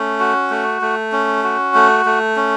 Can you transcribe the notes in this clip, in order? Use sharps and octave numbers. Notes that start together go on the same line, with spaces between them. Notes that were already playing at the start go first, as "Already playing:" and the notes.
Already playing: A3 C#4
F#4
A3
A3
C#4
F#4
A3
A3
C#4